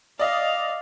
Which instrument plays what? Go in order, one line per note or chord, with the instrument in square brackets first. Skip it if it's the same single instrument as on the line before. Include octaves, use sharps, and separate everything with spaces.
[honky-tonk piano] D5 D#5 [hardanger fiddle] F5